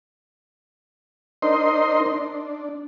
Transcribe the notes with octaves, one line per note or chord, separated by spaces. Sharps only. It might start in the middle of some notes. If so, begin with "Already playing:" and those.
D4 D#4 A#4 C5 D#5 C6
D4